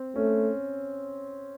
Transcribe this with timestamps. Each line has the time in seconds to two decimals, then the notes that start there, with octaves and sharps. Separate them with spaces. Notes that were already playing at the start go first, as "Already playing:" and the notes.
Already playing: C4
0.16 A3 C#4